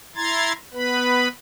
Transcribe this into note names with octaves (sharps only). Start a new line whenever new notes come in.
E4 A#5 C6 G#6 A6
B3 B4 B5